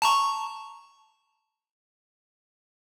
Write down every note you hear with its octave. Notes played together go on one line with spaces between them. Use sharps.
A5 A#5 C#6